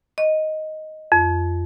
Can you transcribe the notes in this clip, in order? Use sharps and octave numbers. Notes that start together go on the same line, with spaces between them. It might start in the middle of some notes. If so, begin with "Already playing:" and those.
D#5
F2